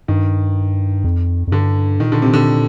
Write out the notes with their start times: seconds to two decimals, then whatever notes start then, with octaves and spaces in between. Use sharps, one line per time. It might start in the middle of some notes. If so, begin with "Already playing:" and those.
0.08 G2 D#3
1.04 F2
1.47 F2
1.52 G2 D3
2.00 A#2 D#3
2.12 D3
2.22 C3
2.34 D3